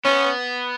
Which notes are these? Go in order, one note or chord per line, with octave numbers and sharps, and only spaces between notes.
B3 C#4